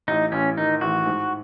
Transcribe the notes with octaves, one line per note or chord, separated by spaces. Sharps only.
A1 D#4
A1 C#4
D#3 D#4
A1 F#4
G#2